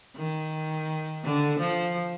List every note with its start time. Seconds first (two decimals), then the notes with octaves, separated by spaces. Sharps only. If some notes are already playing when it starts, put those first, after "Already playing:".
0.16 D#3
1.24 D3
1.60 F3